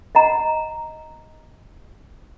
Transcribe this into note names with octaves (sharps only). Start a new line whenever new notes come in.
D#5 F#5 A#5